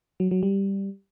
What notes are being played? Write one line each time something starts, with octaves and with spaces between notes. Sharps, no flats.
F#3
F#3
G3